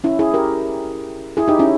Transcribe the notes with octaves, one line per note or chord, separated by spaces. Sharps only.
C#4 E4
E4 G#4
G4 A#4
E4 G#4
D#4 G4
C#4 E4